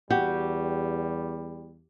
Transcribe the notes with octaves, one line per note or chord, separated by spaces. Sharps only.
E2 G3 F#4 G4